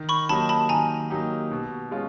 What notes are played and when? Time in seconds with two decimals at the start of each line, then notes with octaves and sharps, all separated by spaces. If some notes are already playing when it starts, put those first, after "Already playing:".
Already playing: D#3
0.09 B5 C#6
0.29 F#3 A#3 D#4 G4 A5 B5
0.49 A5 B5
0.69 D#3 G#5 A#5
1.10 F#3 A#3 D#4 G4
1.51 B2
1.91 G#3 C#4 F4